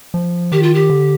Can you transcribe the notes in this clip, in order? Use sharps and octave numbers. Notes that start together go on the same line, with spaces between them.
F3
D#3 G4
F4
G4
D3